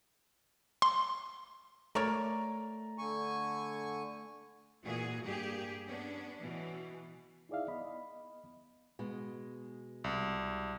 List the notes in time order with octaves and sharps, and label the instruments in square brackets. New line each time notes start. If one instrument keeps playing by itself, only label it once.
[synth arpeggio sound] C6
[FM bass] A3 [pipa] A#4 C#5 D5 [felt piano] A#5
[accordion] D3 G#5 C#6
[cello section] A#2 E3 F#4 G#4
G2 A#3 G4 G#4
B3 C#4 D4
B2 E3
[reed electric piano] D#4 E4 G#4 D5 E5 F5
B3 D#5 B5
[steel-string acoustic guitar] B2 G#3
[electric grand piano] C2